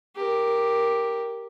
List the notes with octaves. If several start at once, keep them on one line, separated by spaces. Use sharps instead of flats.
G4 A#4